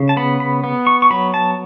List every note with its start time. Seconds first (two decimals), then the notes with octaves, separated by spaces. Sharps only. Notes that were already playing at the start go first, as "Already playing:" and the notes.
Already playing: C#3
0.09 A5
0.17 B3 B5
0.40 B5
0.64 B3
0.87 C#6
1.02 C#6
1.10 F#3 B5
1.34 A5